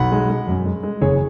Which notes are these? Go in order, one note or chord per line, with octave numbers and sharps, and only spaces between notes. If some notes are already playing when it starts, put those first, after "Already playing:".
Already playing: B1 F#5 B5
G#3
G#3
F#2
G#3
G#3
F#1 G#4 C#5